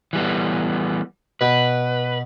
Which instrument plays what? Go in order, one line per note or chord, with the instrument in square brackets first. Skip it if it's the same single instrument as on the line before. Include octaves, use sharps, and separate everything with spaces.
[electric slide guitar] E3 G3 B3
[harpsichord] B2 [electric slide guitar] B4